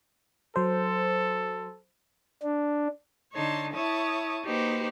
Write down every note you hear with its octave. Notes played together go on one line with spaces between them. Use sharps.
F#3 A4 C5
D4
D3 D#4 C#5 A5 C6
E4 C#5 A5 C#6 D#6
A#3 D#4 F#4 G4 B4 C5